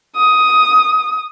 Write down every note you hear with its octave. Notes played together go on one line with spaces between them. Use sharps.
D#6